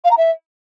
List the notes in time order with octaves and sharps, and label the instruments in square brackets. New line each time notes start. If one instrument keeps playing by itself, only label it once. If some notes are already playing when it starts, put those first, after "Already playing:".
[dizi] F5
A#5
E5